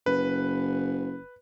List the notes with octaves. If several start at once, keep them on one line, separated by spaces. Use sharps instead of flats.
F#1 B4